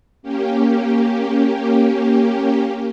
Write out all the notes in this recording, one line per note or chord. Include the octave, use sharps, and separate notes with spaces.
A#3 C#4 G4